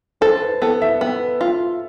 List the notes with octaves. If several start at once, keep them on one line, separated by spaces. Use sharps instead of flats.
A4 C5
B4
B3 A4
E5
B3
F4